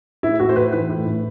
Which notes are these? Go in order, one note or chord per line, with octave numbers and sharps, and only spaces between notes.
A2 E4
A2 F#4
C5
A2 B4
E3 B4
A2
A2